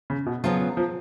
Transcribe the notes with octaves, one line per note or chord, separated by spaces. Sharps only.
C#3
B2
C#3 F3 F#3 B3 F4
F3